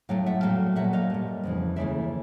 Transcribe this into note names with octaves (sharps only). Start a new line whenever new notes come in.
A2 F#3 A3 F5 G5
E5 F#5
A#2 F#3 A3 F5 G5
A#2 F#3 A3 E5 F#5
D#5 F5
A#2 G3
F2 C#3 E3
D#2 C#3 E3 A3 D5 E5